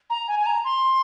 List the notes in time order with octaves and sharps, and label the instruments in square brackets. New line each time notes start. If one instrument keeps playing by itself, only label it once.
[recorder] A#5
G#5
G#5
A#5
C6